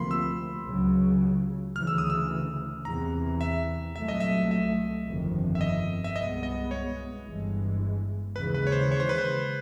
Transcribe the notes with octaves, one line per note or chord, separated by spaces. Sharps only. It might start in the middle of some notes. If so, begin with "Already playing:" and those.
Already playing: D2 C3 F3 A#3 B5 C6
E6
C#2 C#3 F#3
D2 C#3 E3 F6
E6
D#6
E6
E2 C3 E3 A#5
E5
C2 A#2 F#3 A3 E5
D#5
E5
E5
G1 F2 C3 D#3
E5
D#5
E5
C2 B2 G#3 B3 D#5
D#5
C#5
G1 G2 E3 G#3
D#2 C#3 E3 G#3 B4
B4
C#5
C5
C#5
C5
B4
C5